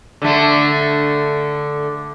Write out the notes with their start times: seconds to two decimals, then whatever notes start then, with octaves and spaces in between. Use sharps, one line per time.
0.22 D3 A3